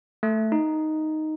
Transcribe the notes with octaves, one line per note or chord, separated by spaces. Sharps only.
A3
D#4